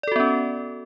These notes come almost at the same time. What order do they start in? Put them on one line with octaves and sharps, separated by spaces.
D5 A4 F#4 B3 C#4